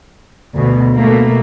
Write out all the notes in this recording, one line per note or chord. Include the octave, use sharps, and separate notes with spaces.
D2 B2
B2 A3 A#3